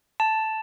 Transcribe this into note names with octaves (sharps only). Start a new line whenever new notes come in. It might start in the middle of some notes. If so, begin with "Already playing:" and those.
A5